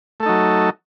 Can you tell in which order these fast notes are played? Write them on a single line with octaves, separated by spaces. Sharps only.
A3 A4 D#4 F#3